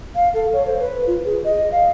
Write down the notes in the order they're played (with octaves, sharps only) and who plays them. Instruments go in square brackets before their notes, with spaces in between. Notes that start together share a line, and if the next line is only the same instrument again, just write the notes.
[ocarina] F5
A4
C#5
C5
B4
F4
G#4
D#5
F5